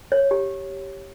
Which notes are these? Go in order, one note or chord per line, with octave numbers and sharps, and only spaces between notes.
C#5
G4